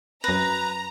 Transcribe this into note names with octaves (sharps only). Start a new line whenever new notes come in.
F#2 B4 A#5 A#6